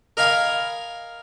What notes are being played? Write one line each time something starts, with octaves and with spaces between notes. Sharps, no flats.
A#4 D#5 F5 G#5 B5 D#6